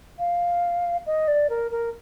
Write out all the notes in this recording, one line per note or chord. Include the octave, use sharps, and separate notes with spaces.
F5
D#5
D5
A#4
A#4